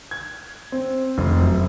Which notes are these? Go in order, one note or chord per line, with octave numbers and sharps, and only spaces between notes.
G#6
C4
F1
F#2